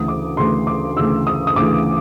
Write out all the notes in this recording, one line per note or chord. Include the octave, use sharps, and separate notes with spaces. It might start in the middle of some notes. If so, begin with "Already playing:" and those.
Already playing: D2 C#3 E3 D#6
D6
D2 C#3 E3 C6
D6
D2 C#3 E3 E6
D#6
D#6
D2 C#3 E3 D6